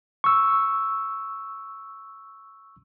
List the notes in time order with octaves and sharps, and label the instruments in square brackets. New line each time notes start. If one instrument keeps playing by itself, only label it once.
[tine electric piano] C#6 E6